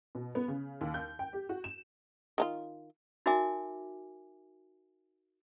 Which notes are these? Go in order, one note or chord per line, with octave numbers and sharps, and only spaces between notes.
B2
B3
C#3
D#2
G6
G5
G4
F#4
E7
D#3 D#4 F4
D#4 F#4 A#4 E5 G#5 D6